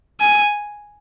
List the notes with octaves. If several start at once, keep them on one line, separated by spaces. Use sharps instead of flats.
G#5